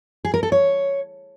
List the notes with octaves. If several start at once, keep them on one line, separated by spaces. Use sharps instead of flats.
G#4
A#4
A4
C#5